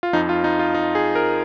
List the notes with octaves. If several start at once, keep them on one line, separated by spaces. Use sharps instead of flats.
F4
F2 F3 D#4
F4
D#4
F4
D#4
G#4
A#4